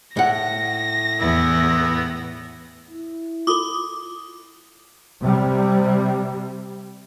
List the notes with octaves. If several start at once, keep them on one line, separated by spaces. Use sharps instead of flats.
A2 F#5 A#6
E2 B3 E4
E4
F4 A4 C6 D6 D#6
C3 G3